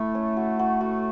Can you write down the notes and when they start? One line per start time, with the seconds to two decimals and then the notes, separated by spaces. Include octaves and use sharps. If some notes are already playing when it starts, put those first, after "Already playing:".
Already playing: A3 E4 E5
0.15 C#4
0.36 F#4
0.59 F#4
0.81 F#4